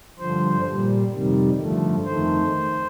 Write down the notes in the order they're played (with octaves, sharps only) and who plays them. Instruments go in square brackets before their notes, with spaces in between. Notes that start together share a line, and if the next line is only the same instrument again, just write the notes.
[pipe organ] G2 D3 F3 C5
A#2 G3
F2 C3 D#3 G3
G2 D3 F3 A3
F2 D#3 A3 C5